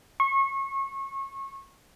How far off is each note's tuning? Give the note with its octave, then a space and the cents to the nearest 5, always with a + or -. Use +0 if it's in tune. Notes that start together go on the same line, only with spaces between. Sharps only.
C#6 -30